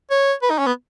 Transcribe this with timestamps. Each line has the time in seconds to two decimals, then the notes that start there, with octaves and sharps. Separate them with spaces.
0.11 C#5
0.42 B4
0.50 D#4
0.59 C#4
0.67 B3